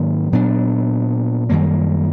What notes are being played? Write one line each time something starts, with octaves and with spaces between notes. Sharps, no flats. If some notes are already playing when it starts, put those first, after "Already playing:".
Already playing: G#2 D#3 F#3 A#3
A#2 F#3 B3 D4
F#2 D#3 G3 A#3